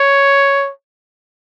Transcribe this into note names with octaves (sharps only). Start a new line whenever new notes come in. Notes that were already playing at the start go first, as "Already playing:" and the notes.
Already playing: C#5